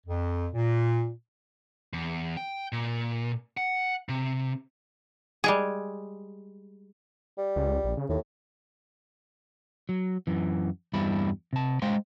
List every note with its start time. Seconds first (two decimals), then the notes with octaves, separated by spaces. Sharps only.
0.07 F2
0.53 A#2
1.93 E2
2.37 G5
2.72 A#2
3.57 F#5
4.09 C3
5.44 G3 G#3 G#4
7.38 G3
7.56 C#2
7.84 A#1
7.97 C#3
8.09 D#2 A2
9.89 F#3
10.27 F#2 E3
10.93 E2 G2 G3 E4 B5
11.53 C3 A5
11.82 G#3 C5 D#5 F5 G5 C6